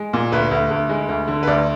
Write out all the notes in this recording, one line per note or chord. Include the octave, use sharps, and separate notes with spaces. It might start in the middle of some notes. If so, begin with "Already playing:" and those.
Already playing: G#3
A#2
D2 B4
D2
D2
G#3
D2
D3
B4
D2 D5